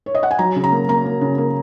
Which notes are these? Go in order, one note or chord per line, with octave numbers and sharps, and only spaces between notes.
C#5
D#5
F#5
G#5
F#3 A#5
C#3
A#5
A#3
A#3 A#5
A#3
C#3
A#3